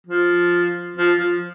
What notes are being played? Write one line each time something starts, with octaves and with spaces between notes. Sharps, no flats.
F3
F3
F3